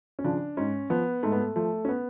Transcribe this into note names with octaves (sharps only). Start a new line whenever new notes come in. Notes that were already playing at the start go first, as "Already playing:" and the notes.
C#4
C#3 F3 D4
G#2 C#4
F3 B3
G#2 A3
B3
A3
F3 A3
C#4
B3